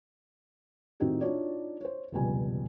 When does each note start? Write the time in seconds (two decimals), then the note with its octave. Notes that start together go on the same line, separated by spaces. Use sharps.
1.00 A2 D#3 C4 D#4 F#4 G4
1.21 D4 D#4 F4 F#4 C#5 D5
1.81 C5 C#5
2.12 F1 C#2 B2 G3 G#5